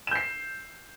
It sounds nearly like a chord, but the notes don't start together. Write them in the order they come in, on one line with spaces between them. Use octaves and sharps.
E7 G6 C7